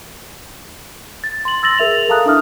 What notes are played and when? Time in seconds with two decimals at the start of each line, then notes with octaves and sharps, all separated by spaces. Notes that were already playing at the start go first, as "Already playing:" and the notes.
1.24 A6
1.45 C6 F#7
1.63 E6 A6 A#6 F#7
1.78 G#4 A#4 E5 F7
2.09 A4 F5 A5 A#5 D#6 F#6
2.26 D4 E4 E5 D#6 F6